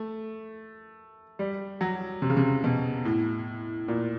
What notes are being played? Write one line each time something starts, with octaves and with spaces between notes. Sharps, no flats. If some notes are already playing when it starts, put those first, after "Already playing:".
Already playing: A3
G3
F#3
C3
C#3
C3
B2
A2
A#2